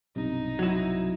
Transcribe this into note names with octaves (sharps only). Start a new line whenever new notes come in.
B1 G2 C3 D#4
F#3 E4